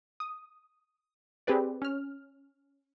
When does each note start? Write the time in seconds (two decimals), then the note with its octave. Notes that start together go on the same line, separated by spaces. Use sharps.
0.20 D#6
1.47 C4 G4 G#4 B4 D5
1.82 C#4 F6